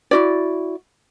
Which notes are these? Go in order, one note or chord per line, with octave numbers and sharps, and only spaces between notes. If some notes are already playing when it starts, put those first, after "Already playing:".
E4 F#4 D5